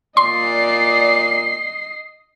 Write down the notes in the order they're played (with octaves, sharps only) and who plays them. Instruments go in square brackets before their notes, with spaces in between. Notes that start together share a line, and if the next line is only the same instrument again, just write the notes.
[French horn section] A#2 D5 [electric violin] D#5 C7 [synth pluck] C6